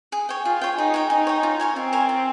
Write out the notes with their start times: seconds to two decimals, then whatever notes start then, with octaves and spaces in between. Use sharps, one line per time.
0.12 G#4
0.29 C#5 G5
0.45 F4 G#4
0.61 C#5 G5
0.78 D#4 G#4
0.94 C#5 G5
1.10 D#4 G#4
1.27 C#5 G5
1.43 F4
1.60 A#4 C#5 G#5
1.76 C4 F4
1.93 A#4 C#5 G#5
2.09 F4